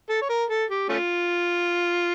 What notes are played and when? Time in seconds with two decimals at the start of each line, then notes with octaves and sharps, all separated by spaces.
0.09 A4
0.22 C#5
0.30 A#4
0.50 A4
0.70 G4
0.89 A3 C#4 F4